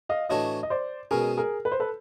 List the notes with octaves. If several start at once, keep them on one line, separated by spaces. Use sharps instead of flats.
D#5 F5
A2 E3 A3 D4 F#4 C#5 D#5
D#5
C5 D5
B2 G#3 C#4 G#4 A#4
G#4 A#4
B4
C5
A4 B4